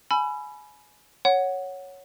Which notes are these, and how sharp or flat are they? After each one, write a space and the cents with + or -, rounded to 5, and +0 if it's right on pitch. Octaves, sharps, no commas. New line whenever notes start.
G#5 +20 B5 +0 E6 +45
C#5 +0 F#5 +0